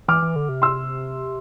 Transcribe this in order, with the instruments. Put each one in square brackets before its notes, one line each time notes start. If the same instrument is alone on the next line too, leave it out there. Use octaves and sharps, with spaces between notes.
[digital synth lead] E3 [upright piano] D6 F6
[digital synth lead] E3
D3
C3
[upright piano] C6 E6